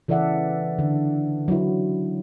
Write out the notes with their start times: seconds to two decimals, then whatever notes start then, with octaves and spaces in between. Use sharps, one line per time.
0.08 C#3 E3 A4 D5 E5 F#5
0.79 D3
1.48 F#3 E4